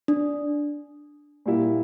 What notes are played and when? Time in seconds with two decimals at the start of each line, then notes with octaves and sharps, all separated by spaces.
0.08 D4
1.46 A#2 G3 A#3 E4 G4